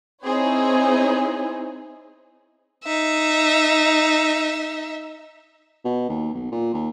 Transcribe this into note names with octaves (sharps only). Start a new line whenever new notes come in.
C4 D#4 E4 G#4 C5 C#5
D#4 E5
B2
D#2
B1
A#2
D#2